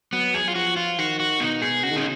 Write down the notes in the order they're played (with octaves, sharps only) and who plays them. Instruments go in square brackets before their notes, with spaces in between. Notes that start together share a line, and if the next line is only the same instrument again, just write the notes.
[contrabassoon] F#3 [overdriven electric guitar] B3
[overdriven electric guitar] G#4
[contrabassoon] F#3 [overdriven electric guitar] F4
[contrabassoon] F3 [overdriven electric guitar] F#4
[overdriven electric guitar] F4
[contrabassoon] D#3 [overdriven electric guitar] F#4
[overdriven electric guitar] F#4
[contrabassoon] B2 [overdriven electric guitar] D#4
[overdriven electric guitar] G#4
[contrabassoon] C#3 [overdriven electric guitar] F#4
[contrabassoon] D#3
[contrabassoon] C#3 [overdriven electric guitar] D#4